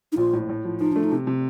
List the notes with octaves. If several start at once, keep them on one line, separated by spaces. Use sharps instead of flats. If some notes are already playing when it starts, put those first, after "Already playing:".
D#4
A#1 F4
A2
A2
F3
F3 D#4
A3 D4
D#4
C3
C3